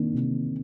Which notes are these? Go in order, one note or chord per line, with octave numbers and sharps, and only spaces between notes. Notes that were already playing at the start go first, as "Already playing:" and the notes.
Already playing: C3 D#3 A#3 D4
C3